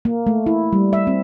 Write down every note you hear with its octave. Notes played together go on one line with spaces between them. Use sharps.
A#3
A3
E4
G3
E5
C4